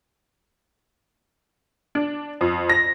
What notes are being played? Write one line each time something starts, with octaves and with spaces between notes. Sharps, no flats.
D4
F2
A#6